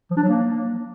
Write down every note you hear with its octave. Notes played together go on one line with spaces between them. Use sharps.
F3
D4
F#3
A#3